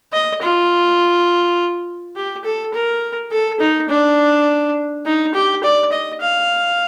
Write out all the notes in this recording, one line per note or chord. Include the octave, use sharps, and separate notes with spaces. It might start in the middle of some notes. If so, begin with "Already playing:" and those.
D#5
F4
G4
A4
A#4
A4
D#4
D4
D#4
G4
D5
D#5
F5